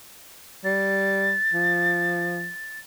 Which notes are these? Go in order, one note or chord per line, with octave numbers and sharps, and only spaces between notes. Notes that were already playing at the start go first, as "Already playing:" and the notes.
G3 A6
F3